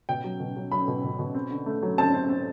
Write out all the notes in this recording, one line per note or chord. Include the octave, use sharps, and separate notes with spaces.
B2 G5
F#3
B2
F#3
F#3 B5
B2
B2
B2
C4
D3
A3
F#3
C4 A5
C4
C4